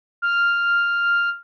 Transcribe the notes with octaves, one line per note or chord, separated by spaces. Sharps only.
F6